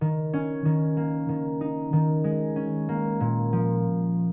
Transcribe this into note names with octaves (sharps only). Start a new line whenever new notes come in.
D#3
C#4
D#3
A#3
D#3
D#4
D#3
G#3
C#4
A#3
A#2
F3